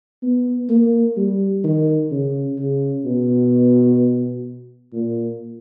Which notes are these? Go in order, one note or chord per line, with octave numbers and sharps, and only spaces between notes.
B3
A#3
G3
D#3
C#3
C#3
B2
A#2